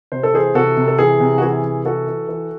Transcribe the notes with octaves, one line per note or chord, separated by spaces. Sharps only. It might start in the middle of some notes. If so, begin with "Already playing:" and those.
C3 C5
A4
E3 G#4 C5
C3 F#4 A4
C3
A4
E3 G#4
C3
F#4
E3 G#4
C3
E3 F#4 A4
E3
E3